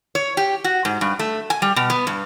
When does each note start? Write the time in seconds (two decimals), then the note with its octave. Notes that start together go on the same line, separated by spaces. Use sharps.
0.15 C#5
0.37 G4
0.64 F#4
0.85 G#2
1.01 G2
1.19 A3
1.50 G#5
1.62 G3
1.76 B2
1.90 B3
2.07 G2